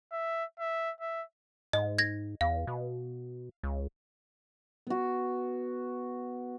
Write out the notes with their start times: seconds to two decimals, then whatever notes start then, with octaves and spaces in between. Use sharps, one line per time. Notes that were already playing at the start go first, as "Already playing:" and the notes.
0.12 E5
0.59 E5
1.01 E5
1.73 G#2 D#5
1.98 G#6 A#6
2.41 E2 F5
2.67 B2
3.63 C#2
4.87 B3 F#4